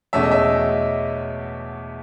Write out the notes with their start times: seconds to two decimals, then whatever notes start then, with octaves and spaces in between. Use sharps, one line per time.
0.13 E2 B2 A3 C#4 E5
0.23 D#5
0.31 E5